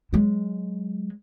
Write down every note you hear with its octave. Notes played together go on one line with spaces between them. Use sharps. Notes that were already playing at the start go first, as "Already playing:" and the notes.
F#3 G#3